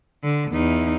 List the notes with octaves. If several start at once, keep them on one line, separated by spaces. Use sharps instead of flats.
D3
E2 D#4